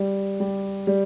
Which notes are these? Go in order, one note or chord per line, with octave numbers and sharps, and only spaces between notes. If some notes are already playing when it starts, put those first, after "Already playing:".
Already playing: G3
G3
G3